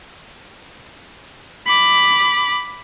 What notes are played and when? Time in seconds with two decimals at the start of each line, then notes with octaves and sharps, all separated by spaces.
1.66 B5 D6